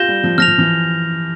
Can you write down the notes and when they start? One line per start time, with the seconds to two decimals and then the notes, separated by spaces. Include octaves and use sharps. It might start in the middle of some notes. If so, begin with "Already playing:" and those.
Already playing: F4 G4 G6 A#6 E7 G7
0.08 G3
0.24 F3
0.38 F3 F6 A#6 F7
0.48 F3
0.58 E3